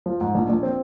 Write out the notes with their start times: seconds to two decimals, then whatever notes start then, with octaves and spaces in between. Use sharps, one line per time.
0.06 F3
0.21 G#2
0.35 A#1
0.49 A#1
0.63 C4